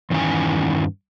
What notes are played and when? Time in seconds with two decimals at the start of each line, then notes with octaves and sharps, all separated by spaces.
0.10 E2 G2 D#3 E3 C#4 G#5